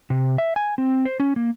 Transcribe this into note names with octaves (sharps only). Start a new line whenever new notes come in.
C3
E5
G#5
C4
C5
C#4
A#3